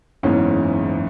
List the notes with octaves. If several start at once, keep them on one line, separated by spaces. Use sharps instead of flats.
F#1 E2 G#2 C#4